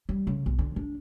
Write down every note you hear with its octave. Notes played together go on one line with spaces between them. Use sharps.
G3
C#3
B1
D3
D4